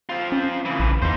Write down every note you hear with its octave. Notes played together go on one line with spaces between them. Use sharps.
C4 F4
C#4
C#3 E3
A#1
E2 D#4 C5